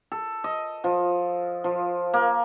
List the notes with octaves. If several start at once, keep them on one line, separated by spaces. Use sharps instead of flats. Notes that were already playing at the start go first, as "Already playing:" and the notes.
A4
D#5
F3
F3
A#3